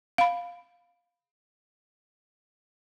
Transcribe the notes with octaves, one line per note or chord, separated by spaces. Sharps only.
F5 B5